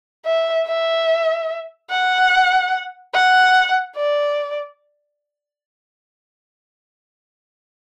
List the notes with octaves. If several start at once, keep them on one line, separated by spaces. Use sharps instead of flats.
E5
E5
F#5
F#5
D5